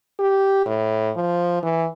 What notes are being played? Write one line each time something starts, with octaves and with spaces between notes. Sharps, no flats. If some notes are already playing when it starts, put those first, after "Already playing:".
G4
A2
F3
E3